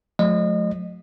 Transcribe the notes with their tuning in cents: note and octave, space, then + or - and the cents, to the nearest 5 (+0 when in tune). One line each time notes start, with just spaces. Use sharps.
F3 +45 A3 -40 D#5 -30